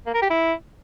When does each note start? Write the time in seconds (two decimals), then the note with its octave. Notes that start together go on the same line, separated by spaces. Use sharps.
0.06 A#3
0.14 A#4
0.22 G4
0.30 E4